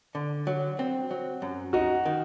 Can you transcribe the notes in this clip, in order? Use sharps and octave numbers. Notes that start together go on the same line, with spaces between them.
D3
F#3
C4
F#3
F#2
D#4 F#4
D#3